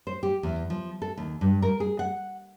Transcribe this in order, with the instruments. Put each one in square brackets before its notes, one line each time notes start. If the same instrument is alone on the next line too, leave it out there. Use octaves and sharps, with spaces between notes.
[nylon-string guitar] C5
G4
E2
F3
A4
D#2
G2
A#4
G#4
F#5